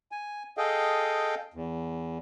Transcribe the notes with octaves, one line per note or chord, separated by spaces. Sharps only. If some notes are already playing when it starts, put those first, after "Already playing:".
G#5
G#4 A4 D#5 F5 G5
E2